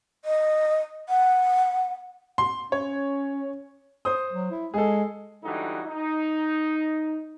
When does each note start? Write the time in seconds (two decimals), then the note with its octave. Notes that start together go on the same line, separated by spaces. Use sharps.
0.25 D#5
1.09 F#5
2.38 C6
2.72 C#4 C#5
4.05 C5 D#6
4.32 F#3
4.51 E4
4.74 G#3 G#4 A4
5.44 G#2 D3 E3 G3 D#4 F#4
5.86 D#4